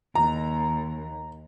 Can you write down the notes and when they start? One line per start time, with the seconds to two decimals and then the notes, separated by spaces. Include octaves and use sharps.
0.15 D#2 A#5